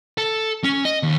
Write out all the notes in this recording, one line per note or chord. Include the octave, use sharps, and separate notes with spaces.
A4
C#4
D#5
D#2